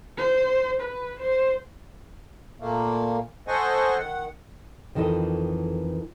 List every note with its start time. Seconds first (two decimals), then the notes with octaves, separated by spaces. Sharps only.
0.18 C5
0.81 B4
1.20 C5
2.60 A#2 A3 A#3
3.48 A4 C5 D#5 F#5 G#5 C#6
3.98 D#3 F#5
4.95 F2 D#3 E3 A4 D#5